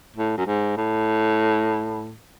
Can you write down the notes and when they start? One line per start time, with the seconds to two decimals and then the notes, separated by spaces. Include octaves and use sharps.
0.16 A2
0.37 F#2
0.46 G#2
0.77 A2